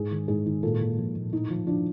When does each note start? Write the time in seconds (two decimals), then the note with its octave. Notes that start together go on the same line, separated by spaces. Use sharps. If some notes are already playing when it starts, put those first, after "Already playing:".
Already playing: G#2 G#4
0.11 D#3
0.28 G#2 G#4
0.46 D#3
0.63 A#2 A4
0.80 A#2
0.98 F3
1.15 A#2
1.32 A2 D#4
1.50 F3
1.67 F3 D4